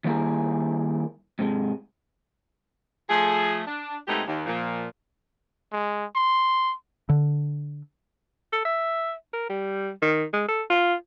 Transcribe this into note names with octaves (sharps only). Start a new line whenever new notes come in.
D#3 G3 A#3 E4 G#4 A#4
G#2 C3 G#3
F3 A3 G#4
D4
B2 G#3 A3 C4 D#4 G4
D#2
A#2 F3
G#3
C6
D3
A4
E5
A#4
G3
D#3
G#3
A4
F4